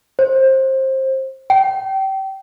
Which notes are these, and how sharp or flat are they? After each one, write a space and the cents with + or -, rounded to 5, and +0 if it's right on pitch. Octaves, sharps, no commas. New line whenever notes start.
C5 +20
G5 -30